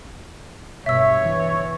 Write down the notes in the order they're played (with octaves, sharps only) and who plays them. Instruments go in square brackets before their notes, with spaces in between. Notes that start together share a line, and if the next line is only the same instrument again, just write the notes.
[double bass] G2 B2 [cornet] C#5 [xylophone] E5 E6
[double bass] E3